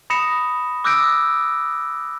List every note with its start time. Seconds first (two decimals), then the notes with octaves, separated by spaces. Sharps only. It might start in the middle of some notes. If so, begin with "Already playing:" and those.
0.10 B5 D#6 A#6 C#7 E7
0.84 D6 E6 F#6 G6 A#6 D7